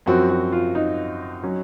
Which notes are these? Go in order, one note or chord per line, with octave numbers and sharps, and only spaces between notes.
F#2 F3 C4 F#4
F#4
F4
D#4
F#3 C#4